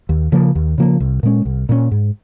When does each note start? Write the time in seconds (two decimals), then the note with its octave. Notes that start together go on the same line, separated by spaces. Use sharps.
0.09 D#2
0.32 C#3 F3 A#3
0.55 D#2
0.78 C#3 F3 A#3
1.00 C2
1.23 A#2 G#3 C#4
1.45 C2
1.69 A#2 G#3 C#4
1.91 G#2